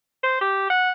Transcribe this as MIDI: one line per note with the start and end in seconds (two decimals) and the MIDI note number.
0.23 0.40 72
0.41 0.68 67
0.70 0.91 78